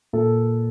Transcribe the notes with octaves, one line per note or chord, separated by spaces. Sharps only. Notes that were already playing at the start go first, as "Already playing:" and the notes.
A#2 A4